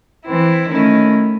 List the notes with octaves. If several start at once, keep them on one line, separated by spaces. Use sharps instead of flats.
E3 C4 E4
D#3 A3 C#4 E4